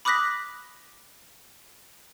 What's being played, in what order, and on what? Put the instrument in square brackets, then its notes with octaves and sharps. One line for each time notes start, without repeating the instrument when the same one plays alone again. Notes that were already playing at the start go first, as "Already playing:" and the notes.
[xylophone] B5 D6 D#6 F#6 A#6 B6